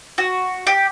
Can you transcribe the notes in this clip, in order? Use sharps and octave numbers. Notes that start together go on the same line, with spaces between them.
F#4
G4